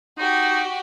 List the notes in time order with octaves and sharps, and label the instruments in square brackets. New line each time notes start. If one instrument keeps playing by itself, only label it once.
[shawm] D#4 [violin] F#4 G4